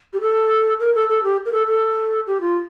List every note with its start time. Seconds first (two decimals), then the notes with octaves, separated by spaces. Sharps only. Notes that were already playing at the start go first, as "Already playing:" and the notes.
0.13 G4
0.21 A4
0.80 A#4
0.95 A4
1.09 A4
1.24 G4
1.46 A#4
1.53 A4
1.67 A4
2.27 G4
2.41 F4